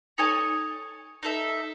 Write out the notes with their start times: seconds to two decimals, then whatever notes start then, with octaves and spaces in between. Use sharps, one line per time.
0.18 D#4 A4 C#5 G#5
1.23 D#4 A4 E5